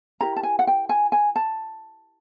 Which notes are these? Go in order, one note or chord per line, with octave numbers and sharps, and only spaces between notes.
E4 G4 A#4 A#5
A5
G#5
F#5
G5
G#5
G#5
A5